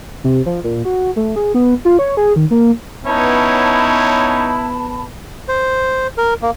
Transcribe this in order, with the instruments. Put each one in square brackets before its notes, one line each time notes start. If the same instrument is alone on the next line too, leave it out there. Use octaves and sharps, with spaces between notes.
[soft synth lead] C3
F3
A#2
F#4
A3
G#4
B3
F4
C#5
G#4
D#3
A#3
[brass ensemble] B3 [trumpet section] C#4 D#4 C#5 [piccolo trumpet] E4 [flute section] A5 B5
[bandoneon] C5
A#4
A#3